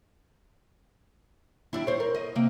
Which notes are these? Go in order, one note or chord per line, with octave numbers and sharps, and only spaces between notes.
G3 D4 E4
C5 C#5
A#4
D#5
C3 A#3